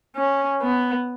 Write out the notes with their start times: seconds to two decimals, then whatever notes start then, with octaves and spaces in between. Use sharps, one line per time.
0.16 C#4
0.61 B3